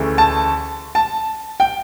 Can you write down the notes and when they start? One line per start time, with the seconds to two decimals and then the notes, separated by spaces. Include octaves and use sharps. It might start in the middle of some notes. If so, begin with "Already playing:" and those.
Already playing: D2 C#3 E3 A3
0.18 A5
0.95 A5
1.60 G5